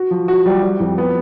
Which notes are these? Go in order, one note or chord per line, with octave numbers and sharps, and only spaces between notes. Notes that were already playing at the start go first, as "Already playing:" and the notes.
Already playing: F#4
F3
F#4
G3
G3
F2
B3